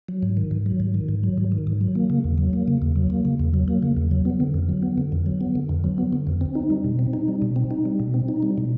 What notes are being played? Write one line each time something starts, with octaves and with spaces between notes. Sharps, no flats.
F#3
G#2
D#3
G#2
F#3
G#2
D#3
G#2
F#3
G#2
D#3
G#2
F#3
A#3
C#3
E2
F#3
A#3
C#3
E2
F#3
A#3
C#3
E2
F#3
A#3
C#3
E2
F#3
B3
D3
F2
F#3
B3
D3
F2
F#3
B3
D3
F2
F#3
B3
D3
F2
C4
D#4
G3
B2
C4
D#4
G3
B2
C4
D#4
G3
B2
C4
D#4
G3
B2